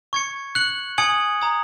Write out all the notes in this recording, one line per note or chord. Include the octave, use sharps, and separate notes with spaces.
C#6 G#6 C#7
F#6 C#7 F#7
G#5 D#6 G#6 C#7 F#7
A#5 D#6 G#6